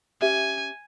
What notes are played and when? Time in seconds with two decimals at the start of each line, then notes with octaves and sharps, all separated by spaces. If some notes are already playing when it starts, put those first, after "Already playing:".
0.22 C#4 G4 E5 G#5